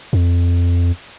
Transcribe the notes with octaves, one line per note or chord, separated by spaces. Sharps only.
F2